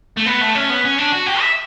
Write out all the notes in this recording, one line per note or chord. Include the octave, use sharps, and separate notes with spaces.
A3
B3
A3
C#4
B3
C#4
D4
F#4
G4
E5